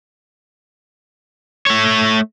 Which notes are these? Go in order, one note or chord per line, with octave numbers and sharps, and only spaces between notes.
A3 C#5